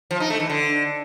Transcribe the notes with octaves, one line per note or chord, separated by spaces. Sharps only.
F3
D#4
A3
E3
D3